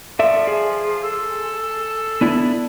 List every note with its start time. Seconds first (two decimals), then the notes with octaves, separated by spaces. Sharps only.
0.19 F3 A4 D5 E5
0.47 G#4
1.03 A4
2.21 B3 D4 E4